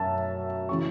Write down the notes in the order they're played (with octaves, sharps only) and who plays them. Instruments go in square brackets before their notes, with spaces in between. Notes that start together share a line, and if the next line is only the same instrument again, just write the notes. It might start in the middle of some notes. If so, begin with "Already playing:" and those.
Already playing: [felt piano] F#2 F#3 E5 A5
C#3 E3 C#6